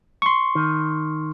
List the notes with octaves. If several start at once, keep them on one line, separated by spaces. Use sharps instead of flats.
C6 C#6
D#3